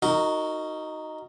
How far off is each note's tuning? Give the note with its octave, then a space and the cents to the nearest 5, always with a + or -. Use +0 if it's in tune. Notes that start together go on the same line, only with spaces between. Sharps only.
D#4 +0 F#4 +0 A#4 -30